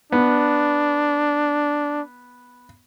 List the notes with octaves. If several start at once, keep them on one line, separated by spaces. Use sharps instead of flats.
B3 D4